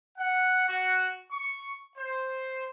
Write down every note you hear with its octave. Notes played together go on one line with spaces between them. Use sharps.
F#5
F#4
C#6
C5